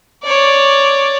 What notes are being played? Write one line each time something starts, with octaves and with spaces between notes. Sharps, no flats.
C#5 D5